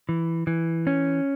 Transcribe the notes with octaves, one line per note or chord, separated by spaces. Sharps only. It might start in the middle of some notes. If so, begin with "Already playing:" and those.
E3
E3
C#4